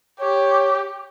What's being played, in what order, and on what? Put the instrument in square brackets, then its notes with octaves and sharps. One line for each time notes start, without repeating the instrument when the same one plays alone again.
[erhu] G4 [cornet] C#5